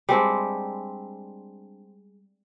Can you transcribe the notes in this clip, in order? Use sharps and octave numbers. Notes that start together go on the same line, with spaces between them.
G3 G#3 C4 D4